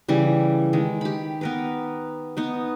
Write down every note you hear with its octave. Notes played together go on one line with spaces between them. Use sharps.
C#3 E3 G3 E4
D#3 G#3
G4 B5
B3 A#4 B4
B3 D#4 B4